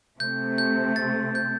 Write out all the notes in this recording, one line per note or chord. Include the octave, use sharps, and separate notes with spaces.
C3 A3 C4 G6
G6
A6
G6